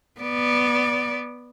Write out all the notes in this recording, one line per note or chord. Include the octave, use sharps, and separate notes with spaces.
B3 D5